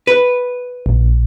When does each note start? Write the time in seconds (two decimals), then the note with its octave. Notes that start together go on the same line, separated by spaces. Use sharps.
0.07 B4
0.86 A#1